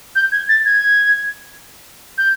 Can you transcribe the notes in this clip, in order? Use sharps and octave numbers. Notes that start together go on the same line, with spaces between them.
G6
G#6
A6
G#6
G6